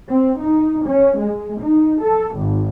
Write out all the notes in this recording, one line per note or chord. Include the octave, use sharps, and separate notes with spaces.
C4
D#4
C#4
G#3
D#4
A4
G#1